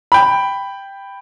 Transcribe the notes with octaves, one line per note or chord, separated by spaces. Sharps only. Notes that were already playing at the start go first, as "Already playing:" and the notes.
G5 B5